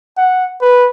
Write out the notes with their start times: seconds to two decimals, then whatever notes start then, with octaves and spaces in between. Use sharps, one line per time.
0.17 F#5
0.61 B4